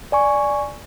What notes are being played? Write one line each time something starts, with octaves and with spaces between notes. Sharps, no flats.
D5 G#5 C#6